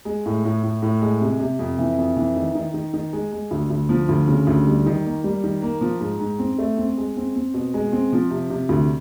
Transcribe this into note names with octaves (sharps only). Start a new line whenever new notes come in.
G#3
A2
A2
A2
A2
G#3
C3
C3
F2
E3
F2
E3
D#3
D#3
D#3
D#3
G#3
G#3
D2
D2
F3
D2
C#3
D2
G3
D#3
A#3
G3
D#3
A#3
F3
G#2
G#2
C4
A3
C4
G#3
C4
C4
B2
G#3
C4
F3
C3
C3
D2